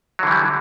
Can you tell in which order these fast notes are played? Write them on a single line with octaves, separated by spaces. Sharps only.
F#3 D3 E3 G3